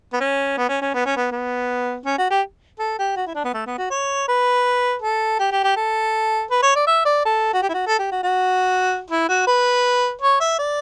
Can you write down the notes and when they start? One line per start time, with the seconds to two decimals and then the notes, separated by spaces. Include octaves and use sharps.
0.13 B3
0.20 C#4
0.57 B3
0.69 C#4
0.81 C#4
0.94 B3
1.05 C#4
1.17 B3
1.31 B3
2.05 C#4
2.18 F#4
2.30 G4
2.79 A4
2.99 G4
3.16 F#4
3.26 E4
3.35 D4
3.44 B3
3.54 A3
3.66 B3
3.78 F#4
3.90 C#5
4.28 B4
5.02 A4
5.39 G4
5.51 G4
5.64 G4
5.76 A4
6.51 B4
6.63 C#5
6.75 D5
6.87 E5
7.05 D5
7.25 A4
7.54 F#4
7.62 G4
7.69 E4
7.74 F#4
7.87 A4
7.99 G4
8.12 F#4
8.23 F#4
9.10 E4
9.28 F#4
9.47 B4
10.21 C#5
10.40 E5
10.59 D5